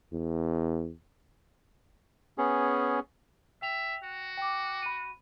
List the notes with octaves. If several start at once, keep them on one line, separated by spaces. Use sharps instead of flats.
E2
B3 C#4 G#4
E5 G5 F7
F#4
G5 D6
B5 D#7